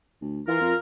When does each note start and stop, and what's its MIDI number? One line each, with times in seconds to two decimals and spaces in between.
0.21 0.42 38
0.48 0.57 52
0.48 0.75 65
0.48 0.75 70
0.61 0.73 41